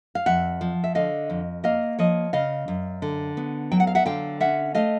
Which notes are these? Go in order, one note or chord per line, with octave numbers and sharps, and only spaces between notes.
F5
F2 E5 F#5
F3
E5
D3 D#5 F5
F2
A#3 D#5 F5
F3 C#5 D#5
C#3 D#5 F5
F#2
D3
B3
F#3 G5
F#5
F5
E5 F#5
D3 F5 G5
C#4 E5 F#5
A3 D#5 F5